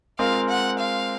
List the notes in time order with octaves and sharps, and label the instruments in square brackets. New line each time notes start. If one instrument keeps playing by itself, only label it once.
[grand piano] G#3 C4 F4 A#4 [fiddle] F5
[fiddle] F#5
F5